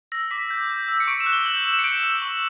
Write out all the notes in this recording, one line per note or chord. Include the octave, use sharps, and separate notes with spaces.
E6 A#6
D6 B6
G6
G6
E6
C#7
C#6 D7
E7
F#6
G7
G6 F#7
E6 E7
C#7
G6 D7
E6
C#6